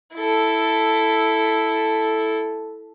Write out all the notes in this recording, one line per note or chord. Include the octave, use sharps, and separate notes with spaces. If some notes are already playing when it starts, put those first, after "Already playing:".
E4 A4